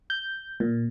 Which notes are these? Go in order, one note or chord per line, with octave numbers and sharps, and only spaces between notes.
G6
A#2